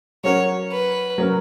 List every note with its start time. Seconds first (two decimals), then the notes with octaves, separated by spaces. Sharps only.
0.24 F#3 C#4 F#4 A#4 C#5
0.72 B4
1.18 F#3 C#4 F#4 A#4